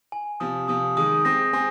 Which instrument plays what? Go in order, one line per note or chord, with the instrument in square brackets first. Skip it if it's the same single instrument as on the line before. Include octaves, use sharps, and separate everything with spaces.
[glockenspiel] G#5
[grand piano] C3 F3 [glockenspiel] D#6
[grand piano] C3 F3 [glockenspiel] D#6
[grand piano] D#3 G#3 [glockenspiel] D#6
[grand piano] G#3 C4 [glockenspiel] A#6
[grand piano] G#3 C4 [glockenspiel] G#5